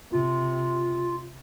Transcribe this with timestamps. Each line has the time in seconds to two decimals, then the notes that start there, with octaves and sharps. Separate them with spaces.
0.12 C3 F4